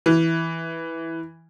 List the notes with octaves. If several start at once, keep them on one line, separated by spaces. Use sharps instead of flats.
E3